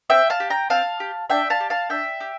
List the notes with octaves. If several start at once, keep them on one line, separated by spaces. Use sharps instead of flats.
C4 E5 G5
F5 A5
G4
G5 A#5
C4 F5 A5
G4
D4 E5 G5
F5 A5
G4
F5 A5
D4 E5 G5
G4